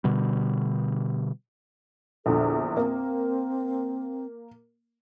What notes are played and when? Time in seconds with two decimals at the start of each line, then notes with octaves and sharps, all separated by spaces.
0.04 B2 D3 G3
2.26 A#1 E2 D3 A4
2.77 A#3 C4